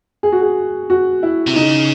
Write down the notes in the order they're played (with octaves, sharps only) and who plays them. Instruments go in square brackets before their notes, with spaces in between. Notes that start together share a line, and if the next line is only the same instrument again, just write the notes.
[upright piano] G#4
F#4
G#4
F#4
E4
[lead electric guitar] C3
[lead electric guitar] C#3 [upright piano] D#4